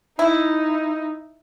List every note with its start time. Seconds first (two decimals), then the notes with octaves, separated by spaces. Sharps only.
0.19 D#4 E4